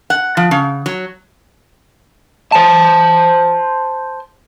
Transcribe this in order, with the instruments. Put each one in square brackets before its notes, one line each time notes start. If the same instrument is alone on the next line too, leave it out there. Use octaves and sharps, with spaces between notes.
[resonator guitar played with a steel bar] F#5
F3
C#3
F#3
[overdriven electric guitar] C5 A5